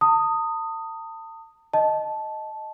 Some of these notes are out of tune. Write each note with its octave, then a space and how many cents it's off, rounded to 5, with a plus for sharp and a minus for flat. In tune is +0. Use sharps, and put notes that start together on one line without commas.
A5 +40 D#6 +0
D#5 +0 A5 -10